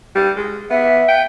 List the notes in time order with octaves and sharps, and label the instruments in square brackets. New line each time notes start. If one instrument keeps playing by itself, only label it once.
[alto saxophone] G3
G#3
[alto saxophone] B3 [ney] E5
[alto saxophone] G5